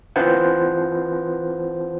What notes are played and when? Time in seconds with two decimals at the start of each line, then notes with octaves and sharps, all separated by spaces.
0.16 E3 C4 F4 B4 C5 F#5